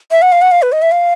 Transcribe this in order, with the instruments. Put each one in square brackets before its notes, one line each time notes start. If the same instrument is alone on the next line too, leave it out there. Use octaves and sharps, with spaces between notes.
[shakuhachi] E5
F#5
F5
F#5
F5
B4
D#5
E5
F5